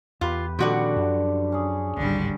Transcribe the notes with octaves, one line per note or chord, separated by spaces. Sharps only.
E2 F4 G4 B4
A#2 D3 D#3 F3 G3 C4 F#4 D5
F#2
C#4 G#4
D1 G#1 D3 G3